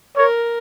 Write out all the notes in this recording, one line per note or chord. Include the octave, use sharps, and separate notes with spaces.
A#4 C#5